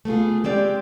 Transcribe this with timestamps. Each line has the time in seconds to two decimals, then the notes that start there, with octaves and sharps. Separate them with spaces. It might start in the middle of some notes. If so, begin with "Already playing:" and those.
0.05 A3 B3 F4 G#4
0.44 G#3 C4 G4 D5